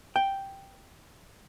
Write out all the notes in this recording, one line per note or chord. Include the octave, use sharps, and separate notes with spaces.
G5